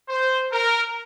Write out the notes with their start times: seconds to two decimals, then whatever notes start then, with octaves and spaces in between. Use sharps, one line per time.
0.08 C5
0.52 A#4